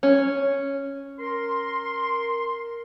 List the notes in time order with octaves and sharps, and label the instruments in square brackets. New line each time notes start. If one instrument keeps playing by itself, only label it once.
[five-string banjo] C#4
[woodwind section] A#4 C6